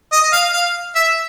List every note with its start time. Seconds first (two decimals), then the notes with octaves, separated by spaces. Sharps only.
0.12 D#5
0.33 F5
0.53 F5
0.96 E5